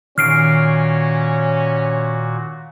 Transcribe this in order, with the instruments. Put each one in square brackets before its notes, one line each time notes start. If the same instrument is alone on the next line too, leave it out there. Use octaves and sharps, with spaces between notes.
[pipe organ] A#2 F#4 [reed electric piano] D#3 [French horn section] C#4 C#5 [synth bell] F6 C7 D7